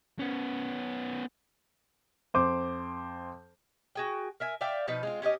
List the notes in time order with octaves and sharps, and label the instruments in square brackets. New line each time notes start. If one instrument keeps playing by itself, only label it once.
[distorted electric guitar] B3 C#4
[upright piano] F2 C5 D6
[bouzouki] F#4 G#4 G5
A#4 E5 G#5
D5 E5 F5 G5
B2 F3 D#4 B4
G#3 C4 F4
C#4 G4 A#4 D#5